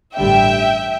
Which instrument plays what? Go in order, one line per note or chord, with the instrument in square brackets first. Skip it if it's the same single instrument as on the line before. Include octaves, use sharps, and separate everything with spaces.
[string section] A1 G2 D3 G3 E5 G5